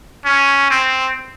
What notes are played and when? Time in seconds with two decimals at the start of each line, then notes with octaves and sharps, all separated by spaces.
0.25 C#4
0.70 C4